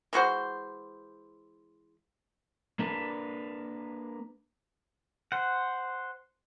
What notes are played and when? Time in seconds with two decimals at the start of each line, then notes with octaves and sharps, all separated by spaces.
0.13 E3 G#3 F#4 C5
2.79 A#3 D4 B4
5.32 C5 F#5